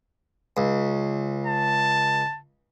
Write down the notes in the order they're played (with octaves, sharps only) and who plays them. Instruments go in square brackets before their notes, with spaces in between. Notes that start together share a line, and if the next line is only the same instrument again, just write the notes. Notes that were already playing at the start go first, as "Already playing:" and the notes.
[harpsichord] C#2
[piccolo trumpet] A5